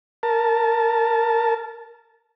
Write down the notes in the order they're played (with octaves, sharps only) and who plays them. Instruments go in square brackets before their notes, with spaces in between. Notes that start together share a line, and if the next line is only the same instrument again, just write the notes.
[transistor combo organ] A#4 A5